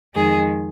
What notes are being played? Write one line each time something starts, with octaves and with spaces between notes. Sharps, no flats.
F2 D#3 G#3 G#4